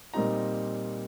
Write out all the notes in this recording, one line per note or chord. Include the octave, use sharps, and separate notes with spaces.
A#2 G3 C4 D#4 A#5